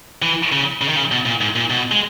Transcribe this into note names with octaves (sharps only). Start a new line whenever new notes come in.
E3
C#3
C#3
D#3
C#3
B2
A#2
G#2
A#2
B2
G#3